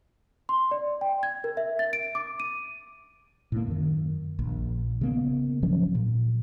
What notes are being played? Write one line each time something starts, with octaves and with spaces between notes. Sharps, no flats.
C6
D5
G5
G#6
A#4
E5
A6
D7
D6
D#7
A2 A#3
F#2 D#3
A#1
C#3 A#3 B3
G#2 F3 F#3 C#4
A#2